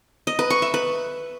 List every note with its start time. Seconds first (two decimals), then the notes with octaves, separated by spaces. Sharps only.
0.27 D#5
0.39 B4
0.50 C#6
0.62 E5
0.74 B4